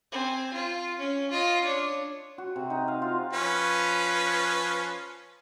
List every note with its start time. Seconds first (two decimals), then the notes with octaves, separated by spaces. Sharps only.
0.12 C4 G#5
0.53 F4
0.99 C#4
1.30 F4 D#5
1.64 D4 C#5
2.38 F#4
2.56 C3
2.70 D#4
2.88 F5
3.02 F4
3.33 F3 C#4 B4